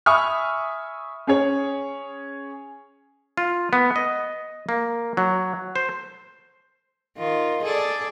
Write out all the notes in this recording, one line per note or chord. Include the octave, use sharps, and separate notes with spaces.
E5 G#5 B5 C#6 D#6 F6
C#4 G#4 C#5
F4
B3
D#5
A#3
F#3
C5
D#3 F4
G#4 A4 D5